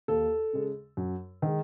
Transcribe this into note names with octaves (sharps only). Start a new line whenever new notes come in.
D#2 A4
C#3 G#3
F#2
D#3 G#3